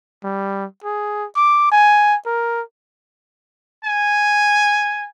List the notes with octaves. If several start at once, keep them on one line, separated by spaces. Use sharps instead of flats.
G3
G#4
D6
G#5
A#4
G#5